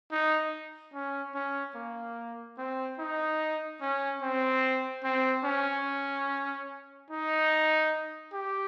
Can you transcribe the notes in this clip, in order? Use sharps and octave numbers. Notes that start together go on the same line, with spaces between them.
D#4
C#4
C#4
A#3
C4
D#4
C#4
C4
C4
C#4
D#4
G4